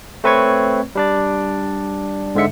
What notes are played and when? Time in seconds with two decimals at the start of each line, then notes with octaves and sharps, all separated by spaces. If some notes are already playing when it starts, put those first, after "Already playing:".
0.24 A3 C4 B4 C#5 C#6 G#6
0.95 G3 D4 D5
2.35 G#2 D3 G#3 E5 C#7